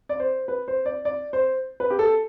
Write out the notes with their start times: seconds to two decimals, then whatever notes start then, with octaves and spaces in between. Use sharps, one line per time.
0.09 D5
0.20 C5
0.48 B4
0.68 C5
0.86 D5
1.05 D5
1.33 C5
1.80 B4
1.90 G4
1.99 A4